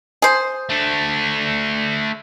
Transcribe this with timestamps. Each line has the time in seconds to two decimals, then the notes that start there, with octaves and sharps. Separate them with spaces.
0.22 G#4 C5
0.70 A3 D4